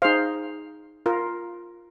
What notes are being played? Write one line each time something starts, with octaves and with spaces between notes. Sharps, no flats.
D#4 G#4 C5 F5
F4 A#4